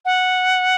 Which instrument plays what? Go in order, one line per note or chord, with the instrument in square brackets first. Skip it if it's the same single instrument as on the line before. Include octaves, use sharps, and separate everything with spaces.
[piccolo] F#5